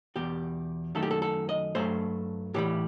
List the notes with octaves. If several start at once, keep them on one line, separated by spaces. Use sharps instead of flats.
E2 B2 G3 G4
F#2 D#3 A3 A4
G4
A4
A4
D#5
G2 F#3 A3 C5
A2 E3 G3 G4